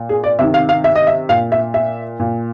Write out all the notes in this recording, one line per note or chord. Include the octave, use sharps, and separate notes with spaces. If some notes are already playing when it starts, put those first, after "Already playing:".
Already playing: A#2
G#4
D5
C3 D#3 E5
F5
F5
E5
D#5
E5
A#2 F5
E5
E5
A#2